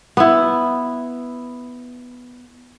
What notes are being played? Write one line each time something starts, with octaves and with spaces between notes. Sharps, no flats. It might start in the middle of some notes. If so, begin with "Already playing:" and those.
B3 E4